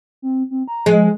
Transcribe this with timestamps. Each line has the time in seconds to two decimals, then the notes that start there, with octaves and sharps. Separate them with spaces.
0.22 C4
0.51 C4
0.68 A#5
0.86 F3 G#3